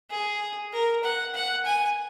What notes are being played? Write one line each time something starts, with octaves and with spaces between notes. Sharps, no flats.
G#4
A#4
F#5
F#5
G#5